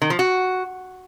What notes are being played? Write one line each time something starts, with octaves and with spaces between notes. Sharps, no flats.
D#3
F3
F#4